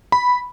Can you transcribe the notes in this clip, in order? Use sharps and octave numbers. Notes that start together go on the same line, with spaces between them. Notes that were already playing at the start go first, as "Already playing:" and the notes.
B5